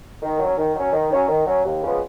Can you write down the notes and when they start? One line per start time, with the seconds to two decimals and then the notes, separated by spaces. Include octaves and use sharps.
0.22 D#3
0.39 F#3
0.44 C#4
0.57 D#3
0.76 F#3 C#4
0.93 D#3
1.11 F#3 C#4
1.28 D#3
1.46 F#3 C#4
1.64 D#2
1.83 C#3 F3 G#3 B3